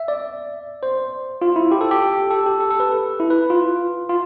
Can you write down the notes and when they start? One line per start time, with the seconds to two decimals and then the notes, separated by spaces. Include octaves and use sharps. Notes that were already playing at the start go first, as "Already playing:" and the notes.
Already playing: E5
0.08 D5
0.83 C5
1.42 F4
1.56 E4
1.72 G4
1.81 A4
1.91 G4
2.31 A4
2.46 G4
2.60 A4
2.70 A4
2.80 B4
3.20 E4
3.30 B4
3.50 F4
4.09 F4